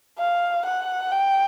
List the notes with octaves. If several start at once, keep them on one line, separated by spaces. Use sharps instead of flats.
F5
F#5
G5